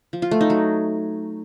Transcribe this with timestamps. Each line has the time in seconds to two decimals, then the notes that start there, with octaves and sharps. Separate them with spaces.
0.13 F3
0.22 F4
0.31 A3
0.41 D#4
0.50 F#3